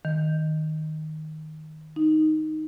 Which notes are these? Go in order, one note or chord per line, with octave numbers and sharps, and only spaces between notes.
D#3
D#4